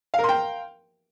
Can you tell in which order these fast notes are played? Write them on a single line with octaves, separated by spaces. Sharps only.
F5 A#4 C6 G5